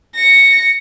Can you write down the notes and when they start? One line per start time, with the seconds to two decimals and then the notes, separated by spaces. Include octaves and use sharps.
0.15 A#6 C#7